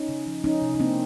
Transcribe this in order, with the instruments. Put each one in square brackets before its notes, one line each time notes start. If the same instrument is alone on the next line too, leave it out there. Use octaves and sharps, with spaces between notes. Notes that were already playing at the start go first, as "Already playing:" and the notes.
Already playing: [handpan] C#4 D#4
C#3
F3
F3 C#4 D#4
C3
D#4
A#3 C4 D4